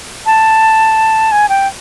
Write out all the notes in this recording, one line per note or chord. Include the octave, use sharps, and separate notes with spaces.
A5
G#5
G5